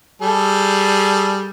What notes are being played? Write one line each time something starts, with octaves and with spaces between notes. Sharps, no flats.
G3 G#4 A4